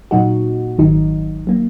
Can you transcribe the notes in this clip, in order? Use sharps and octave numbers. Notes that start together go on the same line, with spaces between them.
A#2 F#3 D#4 F#4
G#1 G#2 D#3 F#3 D#4
F#3 A#3